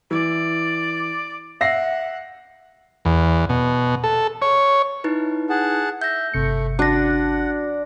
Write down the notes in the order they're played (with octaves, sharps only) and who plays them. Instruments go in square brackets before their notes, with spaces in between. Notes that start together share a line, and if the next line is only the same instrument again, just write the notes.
[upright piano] E3 [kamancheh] D5
[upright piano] E5 A#6 C7 [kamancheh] F#5
[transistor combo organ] E2
B2
A4
C#5
[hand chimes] D#4 E4 B4
[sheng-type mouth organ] G#4 F#5 A5
[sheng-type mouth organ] E5 [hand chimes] G6 A#6
[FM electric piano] G1 C3 C#7 [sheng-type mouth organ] A3
[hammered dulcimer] D4 [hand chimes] F#4 A#6 [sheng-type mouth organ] F#5